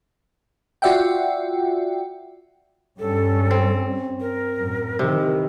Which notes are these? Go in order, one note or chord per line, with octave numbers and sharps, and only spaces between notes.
F4 F#4 D5 E5 F#5 G5
G2 G3 C#4 A4
C4
A#4
F#2 A2
C3 D#3 E3